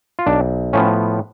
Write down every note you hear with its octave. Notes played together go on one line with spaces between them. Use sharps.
F4
B1 D4
A2 F3 B3 C#4